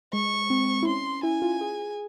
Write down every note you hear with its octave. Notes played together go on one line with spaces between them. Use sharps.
G#3 C#6
C4
E4
C#4 C6
E4 G#5
F4
G#4